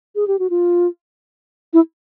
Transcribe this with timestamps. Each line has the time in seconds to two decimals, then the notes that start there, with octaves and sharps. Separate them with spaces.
0.15 G#4
0.28 G4
0.39 F#4
0.50 F4
1.73 E4